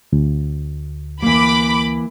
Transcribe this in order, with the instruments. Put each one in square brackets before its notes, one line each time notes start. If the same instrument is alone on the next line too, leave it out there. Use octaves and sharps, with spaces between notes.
[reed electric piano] D2
[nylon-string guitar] E3 A#3 [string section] B5 D6